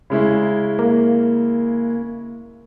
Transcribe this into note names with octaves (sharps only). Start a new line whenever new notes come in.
C#3 G#3 E4
A#3